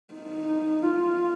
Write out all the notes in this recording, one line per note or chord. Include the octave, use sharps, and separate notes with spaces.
D#4
F4